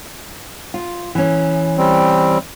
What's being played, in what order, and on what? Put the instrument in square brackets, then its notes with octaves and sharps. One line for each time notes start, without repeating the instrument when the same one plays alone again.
[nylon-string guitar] F4
E3 C#4
[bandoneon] G3 C4